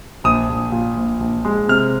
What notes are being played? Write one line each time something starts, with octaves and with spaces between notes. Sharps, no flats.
A#1 D#6
A#1
A#2
A#1
A#1
G#3
C3 F6